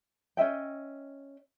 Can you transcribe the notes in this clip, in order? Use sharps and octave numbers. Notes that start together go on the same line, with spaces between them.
C#4 D#5 E5 G5